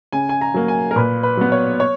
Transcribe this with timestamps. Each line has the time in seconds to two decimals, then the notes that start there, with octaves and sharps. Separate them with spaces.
0.12 C#3 G#5
0.29 G#5
0.41 A#5
0.54 F#3 A#3
0.68 G#5
0.91 A#4
0.96 A#2 B4
1.23 B4
1.37 F#3 B3
1.52 C#5
1.80 C#5